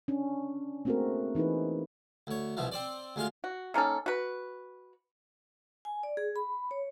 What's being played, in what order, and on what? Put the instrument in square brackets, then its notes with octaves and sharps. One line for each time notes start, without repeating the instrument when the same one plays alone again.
[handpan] C#4 D4
A3 A#3 C4 F#4 G#4 A#4
E3 D#4 E4 G#4 B4
[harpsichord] D2 C#5
C2 B2 E3 F3
C4 C5 D5
D2 G#3 F4 F5
[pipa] F#4
D#3 A#3 C#4 A4
F#4 B4
[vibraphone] G#5
D5
G#4
B5
C#5